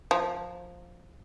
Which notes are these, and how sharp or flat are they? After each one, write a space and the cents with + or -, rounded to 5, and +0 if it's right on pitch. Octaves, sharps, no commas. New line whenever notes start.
F3 +10 A#5 -10